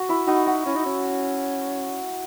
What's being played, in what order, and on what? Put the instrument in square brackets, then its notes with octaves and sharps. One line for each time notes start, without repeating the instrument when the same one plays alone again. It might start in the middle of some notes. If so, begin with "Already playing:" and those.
Already playing: [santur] F#4
E4
[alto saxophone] D#4 [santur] F#4
[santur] F#4
[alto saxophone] C#4 [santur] E4
[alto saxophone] D#4
C#4